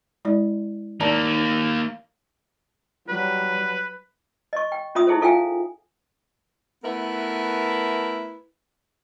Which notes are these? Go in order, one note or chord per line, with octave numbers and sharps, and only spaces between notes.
G#3 E4 D5
D#3 A#3 D5 A5 A#5
F#3 G3 B4
D#5 C#6
G5
C#4 F4 E5 B5 D#6
D#4 E4 G#4 A4 C5
F4 A4 E5 F5 G5 G#5
A3 B3 E4 A#4 B4